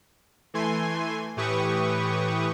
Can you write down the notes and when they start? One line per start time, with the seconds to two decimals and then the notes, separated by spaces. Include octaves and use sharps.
0.54 E3 A3 G#5 C6
1.37 A2 E3 G4 B4 C#6 D#6